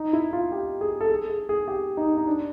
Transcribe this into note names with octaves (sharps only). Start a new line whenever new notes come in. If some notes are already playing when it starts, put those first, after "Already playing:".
Already playing: D#4
E4
F4
G4
G#4
A4
G#4
G#4
G#4
G4
D#4
D#4
D4